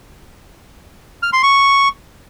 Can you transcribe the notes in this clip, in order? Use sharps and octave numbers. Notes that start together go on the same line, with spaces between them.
F6
C6
C#6